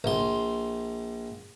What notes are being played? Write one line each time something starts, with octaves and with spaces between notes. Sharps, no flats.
A#1 C6